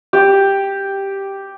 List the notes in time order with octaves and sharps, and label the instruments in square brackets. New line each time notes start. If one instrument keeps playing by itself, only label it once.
[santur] G4